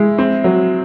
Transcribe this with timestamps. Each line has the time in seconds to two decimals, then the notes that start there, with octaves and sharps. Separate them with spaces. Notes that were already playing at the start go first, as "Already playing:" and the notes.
Already playing: G#3 E4
0.18 C4
0.44 F#3